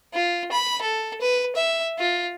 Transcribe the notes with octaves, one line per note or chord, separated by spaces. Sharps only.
F4
B5
A4
B4
E5
F4